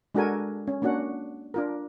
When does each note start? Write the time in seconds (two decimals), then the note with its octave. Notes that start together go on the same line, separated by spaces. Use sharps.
0.15 G#3 D4 F#4 A4 A#4 G#5
0.68 C#4
0.82 A#3 C#4 D4 F#4 F#5
1.54 D4 F4 A#4